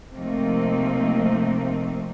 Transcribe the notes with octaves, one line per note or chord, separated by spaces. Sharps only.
C3 F3 A3 A#3 C4 D#4